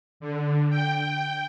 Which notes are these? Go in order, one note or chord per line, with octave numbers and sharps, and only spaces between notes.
D3
G5